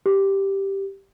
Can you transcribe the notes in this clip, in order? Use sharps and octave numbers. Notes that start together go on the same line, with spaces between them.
G4